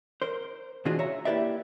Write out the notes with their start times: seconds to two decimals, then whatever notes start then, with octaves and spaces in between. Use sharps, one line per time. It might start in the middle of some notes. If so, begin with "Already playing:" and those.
0.22 A#4 C5
0.85 B2 E3 D4 F4 F#4 G#4
0.99 C#5 E5 A#5
1.25 A#3 E4 G4 B4 D5 E5